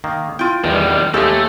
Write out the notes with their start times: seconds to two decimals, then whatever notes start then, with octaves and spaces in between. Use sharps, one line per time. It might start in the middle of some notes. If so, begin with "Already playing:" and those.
0.04 D#3 A#3
0.39 E4 F4 G5
0.64 E2 D#3 G3
1.14 D#2 G#3 A3 G4 A4 E5